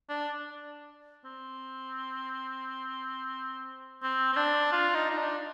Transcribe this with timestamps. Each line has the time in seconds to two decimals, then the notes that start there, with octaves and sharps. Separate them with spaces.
0.09 D4
1.25 C4
4.03 C4
4.33 C4
4.36 D4
4.72 F4
4.94 D#4
5.10 D#4
5.18 D4